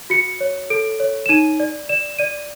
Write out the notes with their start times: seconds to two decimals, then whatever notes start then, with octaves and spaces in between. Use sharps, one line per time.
0.10 F#4 C#7
0.40 C#5
0.70 A4 D7
1.00 C#5
1.26 E7
1.29 D#4 D#7
1.60 D5
1.89 D5 E7
2.19 D5 D#7